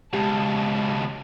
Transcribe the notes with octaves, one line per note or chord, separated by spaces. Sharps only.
C#2 B2 G#3 G4 A5